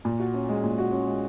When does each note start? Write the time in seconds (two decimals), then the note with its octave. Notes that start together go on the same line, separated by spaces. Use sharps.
0.05 A#2
0.20 F#4
0.34 C#4
0.49 G#3
0.64 A#2
0.78 F#4
0.92 C#4
1.07 G#3